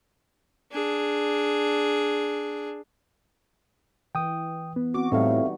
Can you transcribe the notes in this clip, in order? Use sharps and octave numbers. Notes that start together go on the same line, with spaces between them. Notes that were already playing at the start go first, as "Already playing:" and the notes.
D4 G#4
E3 G5 D#6
B3
C4 F#4 D6
A2 G3 B3 C4 D#4 A4 E5 F5